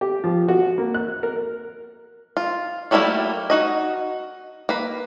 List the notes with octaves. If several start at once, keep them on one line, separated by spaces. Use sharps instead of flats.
G4
F3
F#4
A#3
F#6
A#4
F4
F#3 G3 A3 A#3 E4
D#4 F#4 D#5
A#3 B4